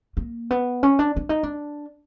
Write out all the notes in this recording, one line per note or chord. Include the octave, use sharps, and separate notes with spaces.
A#3
B3
C#4
D4
D4
D#4
D4